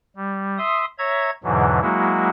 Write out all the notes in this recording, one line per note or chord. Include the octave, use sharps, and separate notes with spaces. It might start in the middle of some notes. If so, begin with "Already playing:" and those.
G3
E5 C6 D#6
C#5 E5 A#5 G#6
E2 G#2 B2 D3 E3 F#3
F#3 G#3 A#3 E4 F#4